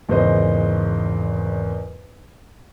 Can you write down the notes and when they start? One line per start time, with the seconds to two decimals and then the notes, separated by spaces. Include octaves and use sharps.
0.09 G#1 E2 C#3 C5 D#5